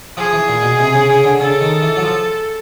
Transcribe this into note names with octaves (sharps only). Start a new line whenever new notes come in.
F3 G#4
E3
A#2
B2
C3
C#3
C#3
D3
C#3 A4
D#3
E3
F#3
F3